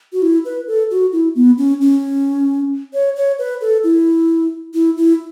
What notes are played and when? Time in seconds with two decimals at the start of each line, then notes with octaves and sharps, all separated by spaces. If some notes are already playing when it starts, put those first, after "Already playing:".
0.13 F#4
0.22 E4
0.45 B4
0.67 A4
0.91 F#4
1.12 E4
1.35 B3
1.58 C#4
1.81 C#4
2.94 C#5
3.16 C#5
3.39 B4
3.61 A4
3.84 E4
4.74 E4
4.97 E4